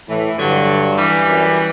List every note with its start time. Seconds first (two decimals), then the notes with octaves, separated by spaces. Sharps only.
0.09 A2 E3
0.39 G2 D3 F#3
0.97 E3 G3
1.27 F#2